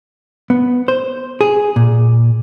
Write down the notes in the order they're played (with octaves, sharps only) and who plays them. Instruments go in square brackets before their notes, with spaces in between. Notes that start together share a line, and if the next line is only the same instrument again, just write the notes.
[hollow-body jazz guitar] B3
C5
G#4
A#2